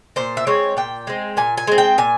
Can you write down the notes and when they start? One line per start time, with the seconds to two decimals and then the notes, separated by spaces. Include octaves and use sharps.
0.16 A#2 C5
0.37 E5
0.47 G#3 C4 C#5
0.77 A#2 G5
1.07 G#3 C4
1.37 A#2 G#5
1.58 G#5
1.67 G#3 C4
1.78 G5
1.98 A#2 G#5